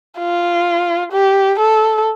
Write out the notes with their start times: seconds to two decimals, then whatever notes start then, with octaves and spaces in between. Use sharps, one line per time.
0.19 F4
1.12 G4
1.59 A4